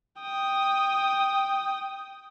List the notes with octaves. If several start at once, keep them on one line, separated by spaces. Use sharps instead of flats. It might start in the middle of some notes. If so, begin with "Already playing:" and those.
G5 D#6